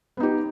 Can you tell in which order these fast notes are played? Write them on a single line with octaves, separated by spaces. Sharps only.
B3 D#4 G4